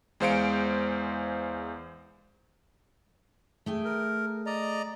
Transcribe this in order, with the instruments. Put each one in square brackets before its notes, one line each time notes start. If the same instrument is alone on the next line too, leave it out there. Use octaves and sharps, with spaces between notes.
[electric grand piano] E2 G#3 C5 F5 C#7 D7
[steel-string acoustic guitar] A3 G#4 G5
[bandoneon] A#4
D5 D#5 A#5